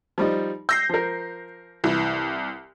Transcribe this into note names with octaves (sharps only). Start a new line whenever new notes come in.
F3 G3 D#4
E6 G6 A#6 C7
F3 A#4
C2 E3